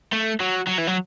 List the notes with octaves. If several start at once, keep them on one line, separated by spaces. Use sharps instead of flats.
A3
F#3
F#3
E3
F#3